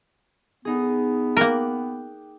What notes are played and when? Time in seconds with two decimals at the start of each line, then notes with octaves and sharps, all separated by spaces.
0.65 B3 D#4 G#4
1.37 A#3 A#4 G5 D6 F#6